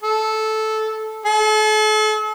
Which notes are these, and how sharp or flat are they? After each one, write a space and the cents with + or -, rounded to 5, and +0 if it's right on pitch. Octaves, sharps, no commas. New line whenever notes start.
A4 -10
A4 -40